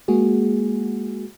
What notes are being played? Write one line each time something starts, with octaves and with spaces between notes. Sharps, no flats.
G#3 A#3 F#4 G#4